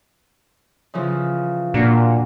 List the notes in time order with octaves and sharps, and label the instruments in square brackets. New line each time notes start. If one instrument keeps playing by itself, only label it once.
[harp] C#3 E3 F3
[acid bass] A#2 [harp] A#3 D4 F#4